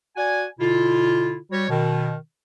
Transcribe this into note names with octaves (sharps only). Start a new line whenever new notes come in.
F#4 D5 F#5 G#5
B2 D3 E4 F4
G3 F#4 C#5
B2 D#3